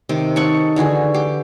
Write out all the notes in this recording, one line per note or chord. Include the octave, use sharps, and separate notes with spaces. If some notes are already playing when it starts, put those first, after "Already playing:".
C3 D#3
D#4 A4 F#5 C#6
D3 E3 F#4 G#4
G4